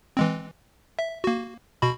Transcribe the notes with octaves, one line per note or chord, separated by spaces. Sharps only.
E3 G#3 C4
E5
A#3 F#4
B2 F#4 B5